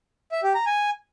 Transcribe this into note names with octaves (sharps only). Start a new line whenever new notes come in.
E5
G4
A#5
G#5